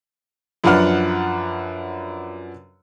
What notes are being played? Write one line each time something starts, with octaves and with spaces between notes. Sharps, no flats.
F#2 F3 D4 B4 F#5 F6